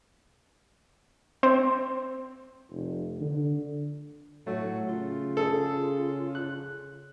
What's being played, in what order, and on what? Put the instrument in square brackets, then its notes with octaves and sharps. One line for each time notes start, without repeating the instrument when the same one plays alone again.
[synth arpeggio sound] C4
[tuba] F1
D3
[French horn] A2 [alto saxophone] F#3 [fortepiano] A3
[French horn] C#3 [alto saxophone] F4
[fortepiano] G#4 A4
F#6